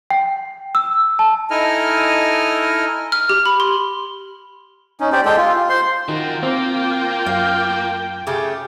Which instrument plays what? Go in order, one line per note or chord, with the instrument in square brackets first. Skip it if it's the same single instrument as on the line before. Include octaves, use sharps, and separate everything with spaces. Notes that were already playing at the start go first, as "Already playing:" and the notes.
[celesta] G5
E6
A5
[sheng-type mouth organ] D#4 E4 A4 D#5 G#5 F6
[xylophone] F6
G4
B5
C6
[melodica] C#4 D#4
G4 C5 D5
G#3 G4 A4 G5
F4
F4
C5 C6
[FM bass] D#3 [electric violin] F4 G5 [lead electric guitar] F#4 A#4
[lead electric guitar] A#3 [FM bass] C4
[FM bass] F#2 [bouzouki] F5
[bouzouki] C#3 A3 G4